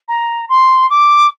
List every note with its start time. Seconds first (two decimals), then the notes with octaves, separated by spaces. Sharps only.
0.08 A#5
0.48 C6
0.89 D6